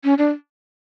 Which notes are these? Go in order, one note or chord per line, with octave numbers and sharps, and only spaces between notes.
C#4
D4